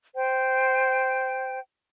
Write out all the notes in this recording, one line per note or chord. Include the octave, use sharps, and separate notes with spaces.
C5 G5